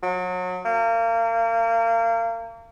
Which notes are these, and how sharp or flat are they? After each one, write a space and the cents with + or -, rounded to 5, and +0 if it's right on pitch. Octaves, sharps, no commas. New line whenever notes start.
F#3 -30
A#3 -30